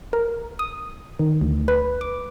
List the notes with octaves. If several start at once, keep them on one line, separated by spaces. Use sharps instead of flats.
A#4
D#6
D#3
D2
B4
D6